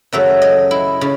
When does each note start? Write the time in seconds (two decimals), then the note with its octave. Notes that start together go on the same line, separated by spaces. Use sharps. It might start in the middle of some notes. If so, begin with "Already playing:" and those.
0.12 F#2 C#3 F#3 A3 E5
0.42 D#5
0.71 E4
1.01 C#3